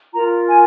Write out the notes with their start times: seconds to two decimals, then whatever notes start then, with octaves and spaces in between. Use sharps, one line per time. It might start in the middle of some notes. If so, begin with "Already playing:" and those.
0.13 F4 A#4 A#5
0.48 G#5